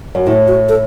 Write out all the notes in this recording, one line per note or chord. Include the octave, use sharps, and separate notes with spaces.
F#2
A2 E4
F#4
A4